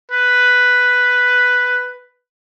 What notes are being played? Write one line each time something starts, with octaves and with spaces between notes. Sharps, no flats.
B4